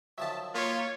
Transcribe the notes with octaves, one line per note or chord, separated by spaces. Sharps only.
D#3 F3 F#3 E5 A5
A#3 F4 C#5 B6 D#7